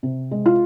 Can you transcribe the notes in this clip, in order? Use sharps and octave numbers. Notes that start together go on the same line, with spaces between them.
C3
G#3
F4